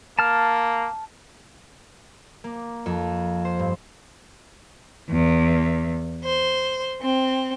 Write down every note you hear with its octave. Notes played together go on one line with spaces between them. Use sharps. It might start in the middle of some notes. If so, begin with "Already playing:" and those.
A#3 A5 F6
A#3
F2
C5
G2
E2
C5
C4